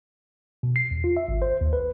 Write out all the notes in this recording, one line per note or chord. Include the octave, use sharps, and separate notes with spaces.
B2
C7
E2
F4
E5
G#1
C5
D#2
B4